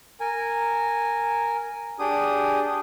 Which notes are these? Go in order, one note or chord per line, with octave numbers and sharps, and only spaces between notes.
A#4 G#5
D4 G4 G#4 D#6